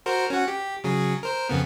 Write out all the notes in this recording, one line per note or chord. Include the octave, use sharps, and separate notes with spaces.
F#4 A#4 C5
C#4 F#4 F#5
G4
C#3 F#3 G#4
A#4 C5
F2 C#3 B3